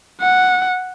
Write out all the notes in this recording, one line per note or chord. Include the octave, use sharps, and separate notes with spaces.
F#5